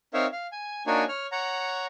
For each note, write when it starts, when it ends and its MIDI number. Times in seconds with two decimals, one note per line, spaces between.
0.14 0.26 60
0.14 0.26 63
0.14 0.26 70
0.14 0.26 73
0.14 0.26 76
0.14 0.26 77
0.32 0.47 77
0.52 0.83 80
0.87 1.04 58
0.87 1.04 62
0.87 1.04 63
0.87 1.04 66
0.87 1.04 73
0.87 1.04 80
1.08 1.27 73
1.08 1.27 89
1.32 1.86 73
1.32 1.86 78
1.32 1.86 82